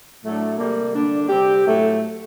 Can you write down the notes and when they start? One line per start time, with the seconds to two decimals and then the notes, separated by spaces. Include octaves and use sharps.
0.22 A2 F#3 A3 D4
0.58 C3 G3 A#3
0.94 D3 G3 D4
1.29 C3 G3 C4 G4
1.66 A2 F#3 A3